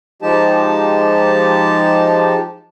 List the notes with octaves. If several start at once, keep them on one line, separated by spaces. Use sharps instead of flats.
F3 G#3 D#4 G4 A5